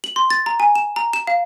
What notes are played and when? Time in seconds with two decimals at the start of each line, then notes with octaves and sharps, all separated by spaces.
0.04 F#7
0.16 C6
0.30 A6
0.46 A#5
0.60 G#5
0.76 E7
0.96 A#5
1.13 E7
1.27 F5